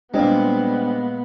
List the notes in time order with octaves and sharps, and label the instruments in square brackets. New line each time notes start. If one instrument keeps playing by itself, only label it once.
[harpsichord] A#2 G#3 [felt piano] G3 C4 D4 [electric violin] B3